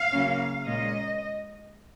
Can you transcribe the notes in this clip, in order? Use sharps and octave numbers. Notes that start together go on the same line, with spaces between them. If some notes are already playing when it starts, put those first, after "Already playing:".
Already playing: F5
C#3 F#3 A#3 C#4
A#2 G#3 C#4 D#5